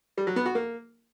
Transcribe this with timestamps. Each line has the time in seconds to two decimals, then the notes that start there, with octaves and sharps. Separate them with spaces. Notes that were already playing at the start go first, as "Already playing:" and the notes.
0.18 G3
0.27 F#3
0.36 B3
0.46 F#4
0.55 A#3